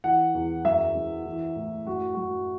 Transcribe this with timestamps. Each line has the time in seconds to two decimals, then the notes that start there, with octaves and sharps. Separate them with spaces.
0.04 E3 F#5
0.35 E2
0.65 F#2 E5
0.96 F#2
1.26 E3
1.56 A2
1.87 F#2 F#4
2.14 F#2 F#4